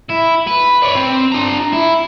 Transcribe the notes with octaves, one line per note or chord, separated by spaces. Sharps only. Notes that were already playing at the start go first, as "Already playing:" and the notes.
E4
B4
C#5 D5
C4
D4 A#5
E4